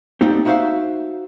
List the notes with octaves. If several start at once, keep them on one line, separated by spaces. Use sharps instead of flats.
A3 A#3 C4 D4 D#4 G4
D#4 E4 F#4 C5 E5 F5